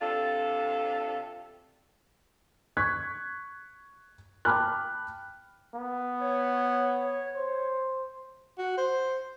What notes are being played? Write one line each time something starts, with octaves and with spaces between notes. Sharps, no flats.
C3 D4 F4 A4
C#6 F#6 G#6 B6
G5 A5 B5 D6 F6 F#6
B3
C#5
C5
F#4
C5